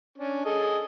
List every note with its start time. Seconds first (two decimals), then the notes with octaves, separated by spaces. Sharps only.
0.18 C#4 D4
0.45 G#4 A4 D#5